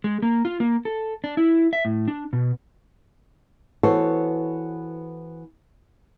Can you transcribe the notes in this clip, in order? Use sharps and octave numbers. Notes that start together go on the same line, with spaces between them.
G#3
A#3
F4
A#3
A4
D4
E4
E5
A2
D4
B2
E3 B3 F#4 A4 C5 C#5